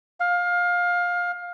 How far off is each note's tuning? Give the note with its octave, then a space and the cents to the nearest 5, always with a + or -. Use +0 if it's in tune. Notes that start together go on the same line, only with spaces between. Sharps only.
F5 +20